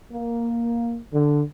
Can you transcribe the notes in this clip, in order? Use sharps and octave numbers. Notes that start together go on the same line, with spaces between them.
A#3
D3